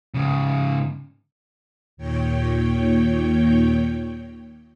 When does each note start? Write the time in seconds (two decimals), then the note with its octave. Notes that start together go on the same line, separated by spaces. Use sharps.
0.14 G#2 C#3
1.97 D#2 A#2 C#5 G5